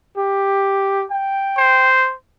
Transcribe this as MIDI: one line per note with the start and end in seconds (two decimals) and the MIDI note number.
0.17 1.05 67
1.11 1.92 79
1.57 2.14 72